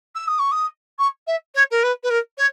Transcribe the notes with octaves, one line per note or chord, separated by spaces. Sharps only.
E6
D#6
C#6
D#6
C#6
E5
C#5
A#4
B4
B4
A#4
C#5